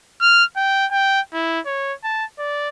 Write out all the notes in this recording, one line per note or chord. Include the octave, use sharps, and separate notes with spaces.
F6
G5
G5
E4
C#5
A5
D5